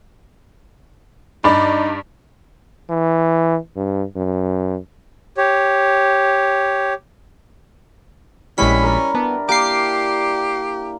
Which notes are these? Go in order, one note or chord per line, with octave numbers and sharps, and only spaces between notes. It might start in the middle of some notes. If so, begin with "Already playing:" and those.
G2 D#4 D5 B5
E3
G2
F#2
G4 C#5
A#1 G3 G#3 C#4 E4 C#6 B6
A#4 D5
B3 D4
A#3 G4 D6 C7